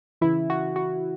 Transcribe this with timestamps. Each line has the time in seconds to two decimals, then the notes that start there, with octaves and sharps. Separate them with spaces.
0.21 C#3 E3 E4
0.50 F#4
0.76 F#4